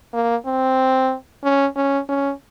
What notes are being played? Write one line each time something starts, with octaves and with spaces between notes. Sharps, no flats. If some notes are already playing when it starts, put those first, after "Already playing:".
A#3
C4
C#4
C#4
C#4